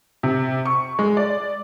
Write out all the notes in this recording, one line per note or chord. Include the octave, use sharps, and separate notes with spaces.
C3
C#6
G#3
D5